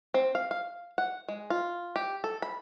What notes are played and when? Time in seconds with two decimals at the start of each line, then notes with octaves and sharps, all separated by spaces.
0.14 C4
0.35 F5
0.51 F5
0.98 F#5
1.29 G#3
1.50 F4
1.96 G4
2.24 A4
2.42 B5